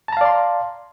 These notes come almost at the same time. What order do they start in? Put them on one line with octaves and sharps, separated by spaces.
A5 A#5 F5 D5 C6